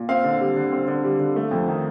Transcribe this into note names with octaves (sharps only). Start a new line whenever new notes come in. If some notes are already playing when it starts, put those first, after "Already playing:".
Already playing: A#2
C4 F5
D3
G3
D3
C4
D3
G3
D3
A3
F2
D#3